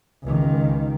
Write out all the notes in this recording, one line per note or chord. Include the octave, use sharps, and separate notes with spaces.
C#2 D#3